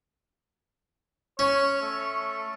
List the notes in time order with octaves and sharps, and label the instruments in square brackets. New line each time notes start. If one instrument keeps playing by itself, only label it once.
[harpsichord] C#4 [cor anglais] C#5
[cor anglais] A3